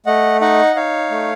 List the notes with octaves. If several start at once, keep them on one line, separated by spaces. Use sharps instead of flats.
A3 D#5 F#5
D#4 D#5 F#5
D#4 C#5 F5
A3